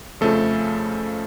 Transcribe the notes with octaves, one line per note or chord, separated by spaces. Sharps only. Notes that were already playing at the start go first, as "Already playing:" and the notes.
F2 C#3 F3 A3 A4